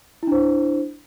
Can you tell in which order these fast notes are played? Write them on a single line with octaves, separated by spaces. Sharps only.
E4 D4 C5